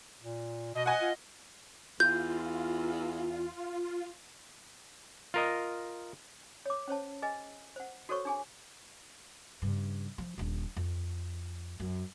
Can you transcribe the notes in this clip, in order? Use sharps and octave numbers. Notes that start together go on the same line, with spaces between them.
A#2
B2 D#5
D#5 F#5 G#5
F4
E2 F4 G6
F4 A#4 D#5
C#5 D6
C#4 C5 C#5 A5
G#4 B4 D#5 G#5
C5 F#5
F#4 A4 A#4 C5 C#5 C#6
D4 G#4 G#5
G2 C#3
F3
D#1 D3
F2
F#2